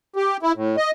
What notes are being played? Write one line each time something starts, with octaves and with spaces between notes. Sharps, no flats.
G4
E4
A2
D#5